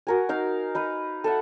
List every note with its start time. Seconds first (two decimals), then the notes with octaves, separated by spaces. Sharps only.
0.07 F#4 A#4 G#5
0.29 D#4 F5
0.75 D#4 B4 F5
1.24 A4 E5 F#5